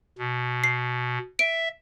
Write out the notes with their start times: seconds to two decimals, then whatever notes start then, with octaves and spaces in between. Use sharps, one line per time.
0.18 B2
0.64 C7
1.39 E5 D7